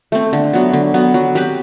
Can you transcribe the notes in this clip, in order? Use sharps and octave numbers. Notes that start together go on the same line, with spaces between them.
A3 C4
D3
F#3 B3
D3
F#3 B3
F#3
C4 G4 B4